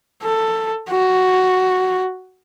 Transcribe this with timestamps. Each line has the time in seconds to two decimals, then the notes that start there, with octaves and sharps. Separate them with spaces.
0.23 A4
0.90 F#4